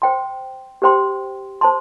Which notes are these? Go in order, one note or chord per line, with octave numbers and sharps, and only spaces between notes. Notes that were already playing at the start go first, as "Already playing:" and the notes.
C5 G5 C6
G4 C5 G5 C6
C5 A5 C6